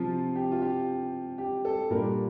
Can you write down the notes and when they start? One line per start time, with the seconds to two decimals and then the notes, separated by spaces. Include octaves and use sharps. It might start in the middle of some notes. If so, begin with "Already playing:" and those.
Already playing: C3 F3 C4 F4
0.36 G4
0.52 F4
0.62 G4
1.38 G4
1.65 A4
1.91 A#2 G3 A#3 D4 A#4